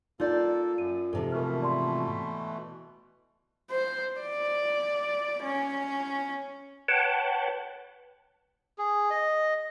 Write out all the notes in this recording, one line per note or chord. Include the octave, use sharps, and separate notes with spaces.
A#3 D#4 F4 A4 D5 G6 A6
F#2 D#7
G#2 C3 F3 A4 A5
B2 E3 A3 A#4 F6
D5 A5 C6
C5
D5
C#4
B4 C#5 F#5 G5 A5
G#4
D#5